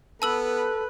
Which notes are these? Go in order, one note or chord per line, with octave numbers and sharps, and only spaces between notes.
B3 A4 B4 A5 E6 F#7